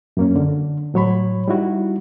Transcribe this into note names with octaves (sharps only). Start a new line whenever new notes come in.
F#2 A#3 C#4
D3
A2 F#3 C#5 B5
G3 D#4 E4 F#4